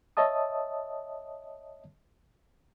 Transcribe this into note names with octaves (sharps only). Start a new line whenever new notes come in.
C#5 D#5 E5 A5 D#6